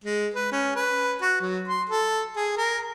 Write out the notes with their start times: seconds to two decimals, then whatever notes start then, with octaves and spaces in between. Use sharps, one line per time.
0.04 G#3
0.34 B4
0.52 C#4
0.76 B4
1.22 F#4
1.41 F#3
1.68 C6
1.89 A4
2.36 G#4
2.57 A#4